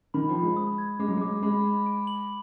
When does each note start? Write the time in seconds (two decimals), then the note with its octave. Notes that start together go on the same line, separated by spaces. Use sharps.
0.14 D#3 B5
0.29 F3
0.35 B5
0.42 G#3
0.57 D#6
0.78 G#6
0.99 G#3 D6
1.08 F#3
1.17 G#3 D6
1.42 G#3 B5
1.64 B5
1.86 D7
2.07 F#7